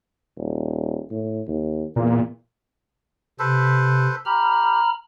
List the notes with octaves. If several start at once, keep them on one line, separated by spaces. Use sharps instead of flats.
D#1
A2
D#2
E2 A#2
C3 A4 B4 C5
G4 A#5 B5 F6